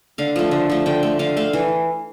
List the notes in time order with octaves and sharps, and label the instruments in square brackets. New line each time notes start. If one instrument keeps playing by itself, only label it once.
[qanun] D3 F5
F3 A3
D3
F3 A3
D3 G5
A3
D3 F5
A3 F5
E3